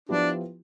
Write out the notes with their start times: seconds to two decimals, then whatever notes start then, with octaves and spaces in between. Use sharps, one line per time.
0.09 F3 B3 D4 E4 G4